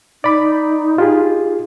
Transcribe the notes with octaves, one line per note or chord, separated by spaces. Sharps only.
D#4 D5 B5 D6
F4 G4 G#4